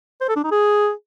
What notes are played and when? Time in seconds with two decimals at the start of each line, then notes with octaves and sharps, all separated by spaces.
0.21 C5
0.29 A4
0.36 D4
0.44 D#4
0.51 G#4